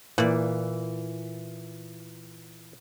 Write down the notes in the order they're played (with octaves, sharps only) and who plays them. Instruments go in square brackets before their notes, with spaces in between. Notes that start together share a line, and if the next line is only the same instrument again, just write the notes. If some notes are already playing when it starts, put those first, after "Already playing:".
[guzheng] A#2 D5 [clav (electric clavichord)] E3